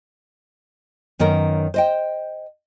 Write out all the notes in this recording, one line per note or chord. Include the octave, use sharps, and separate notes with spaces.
F#2 D#3 B3 C#4 A#4
C5 D#5 G5